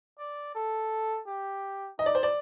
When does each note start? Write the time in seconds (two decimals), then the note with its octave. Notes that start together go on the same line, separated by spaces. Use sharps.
0.19 D5
0.55 A4
1.27 G4
1.99 D#4 D#5
2.06 D5
2.15 C5
2.23 D5